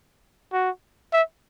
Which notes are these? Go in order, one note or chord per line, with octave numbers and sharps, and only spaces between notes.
F#4
E5